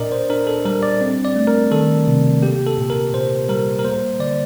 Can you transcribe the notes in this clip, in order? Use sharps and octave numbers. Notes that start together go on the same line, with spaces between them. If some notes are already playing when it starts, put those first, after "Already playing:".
Already playing: A#2 D4 A#4 D5 D#5
C5
D4 A#4
A4
G3 A#4
D5
C4
D5
A3
A#4
D#3 A4
C3
A#3 G4
A4
A#2
A#4
A#2 C5
G3 A#4
A#4
A#3 C5
D3 D5